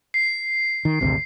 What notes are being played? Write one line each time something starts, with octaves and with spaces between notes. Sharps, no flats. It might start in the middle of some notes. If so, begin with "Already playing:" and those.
C7
D#3
G#1 D2 C3